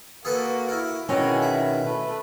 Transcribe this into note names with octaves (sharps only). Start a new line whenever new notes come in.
A#3 F#4 G#4 A4 B4
E4 A#4
B2 D#3 C4 C#4 E4 G#4
E5
A3 B4